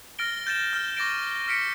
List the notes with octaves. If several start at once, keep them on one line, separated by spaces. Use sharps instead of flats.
F6 A6 A#6 D7 G7
G6 A6 E7
F6 G6
C#6 D6 A6 A#6 D7
F6 B6 C#7 D7